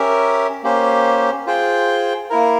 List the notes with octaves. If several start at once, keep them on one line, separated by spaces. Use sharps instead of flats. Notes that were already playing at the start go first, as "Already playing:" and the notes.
Already playing: C#4 G4 A#4 E5
A#3 C#4 G4 C5
F4 G#4 C5 G5
A#3 E4 A#4